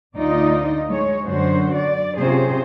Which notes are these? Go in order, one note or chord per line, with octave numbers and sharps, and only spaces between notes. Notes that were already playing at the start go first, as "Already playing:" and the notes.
D2 D#4 F4 D5 D#5
G#3 C#5
F#2 D3 F#4 C5
D5
C3 C#4 F4 G#4 C5